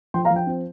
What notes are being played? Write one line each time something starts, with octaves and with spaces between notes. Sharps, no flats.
F3 G5 C6
F5 A#5
F3
G5
C4